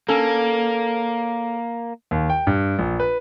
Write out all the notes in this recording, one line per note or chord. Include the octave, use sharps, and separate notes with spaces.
A#3 C#4 A4
D#2
G5
G2
A#1
B4